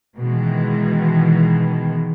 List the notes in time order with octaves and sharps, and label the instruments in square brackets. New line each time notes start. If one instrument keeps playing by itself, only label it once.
[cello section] B2 D#3 E3 G#3